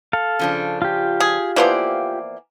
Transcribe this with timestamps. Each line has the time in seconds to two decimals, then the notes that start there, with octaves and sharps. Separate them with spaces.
0.13 A4 F5
0.39 C#3 F3 D4
0.82 F4 G4
1.20 G#4
1.56 E3 F3 A#3 B3 C5 D5